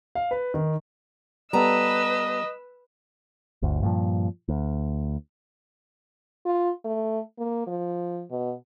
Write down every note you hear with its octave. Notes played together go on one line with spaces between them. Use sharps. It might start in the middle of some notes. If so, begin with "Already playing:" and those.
F5
B4
D#3
G3 B3 A4 B4 D#5 A#5 E6
G1 D2
G2 A#2 F3
D2
F4
A3
A#3
F3
B2